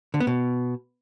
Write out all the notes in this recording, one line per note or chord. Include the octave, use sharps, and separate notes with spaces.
D3
B3
B2